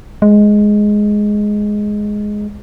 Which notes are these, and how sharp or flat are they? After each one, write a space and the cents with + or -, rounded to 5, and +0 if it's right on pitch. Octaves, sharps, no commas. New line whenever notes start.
G#3 +5